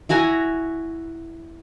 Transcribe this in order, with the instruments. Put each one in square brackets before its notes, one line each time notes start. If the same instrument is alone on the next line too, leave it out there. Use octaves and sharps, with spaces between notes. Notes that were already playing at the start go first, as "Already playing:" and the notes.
[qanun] E4 F#4 G#5 A#5